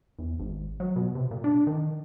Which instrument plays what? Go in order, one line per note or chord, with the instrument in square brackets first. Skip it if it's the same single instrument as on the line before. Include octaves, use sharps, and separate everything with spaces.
[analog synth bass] E2
G#1
F#3
B2
C3
A#2
D4
D#3